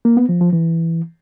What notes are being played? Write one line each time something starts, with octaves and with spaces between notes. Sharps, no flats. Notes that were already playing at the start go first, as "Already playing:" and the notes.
A#3
B3
F3
F3
E3